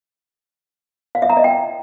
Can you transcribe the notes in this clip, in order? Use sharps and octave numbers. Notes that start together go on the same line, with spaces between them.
F5
E5
A#5
D#5
G5